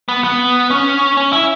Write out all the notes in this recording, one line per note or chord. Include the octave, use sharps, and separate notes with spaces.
B3
B3
C#4
C#4
E4